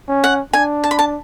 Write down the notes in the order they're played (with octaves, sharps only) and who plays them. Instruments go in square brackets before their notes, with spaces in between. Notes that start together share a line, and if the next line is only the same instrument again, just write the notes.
[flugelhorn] C#4
[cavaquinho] F#5
[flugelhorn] D4 [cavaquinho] G#5
[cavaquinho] A5
B5
A5